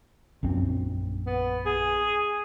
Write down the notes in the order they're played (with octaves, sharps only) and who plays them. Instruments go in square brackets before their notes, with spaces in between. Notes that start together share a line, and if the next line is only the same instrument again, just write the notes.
[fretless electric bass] A#1 F#2 C4
[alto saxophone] B3
G#4